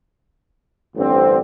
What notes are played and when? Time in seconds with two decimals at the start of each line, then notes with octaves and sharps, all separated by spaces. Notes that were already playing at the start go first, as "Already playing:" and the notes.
0.95 A1 G2 D3 C4